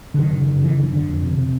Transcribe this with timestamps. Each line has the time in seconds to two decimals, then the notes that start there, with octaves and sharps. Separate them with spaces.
0.14 D3
0.18 F#2 D#3
0.33 C#3
0.48 C#3
0.63 F#2 E3
0.78 D3
0.93 D3
1.08 F2
1.23 C3
1.38 C3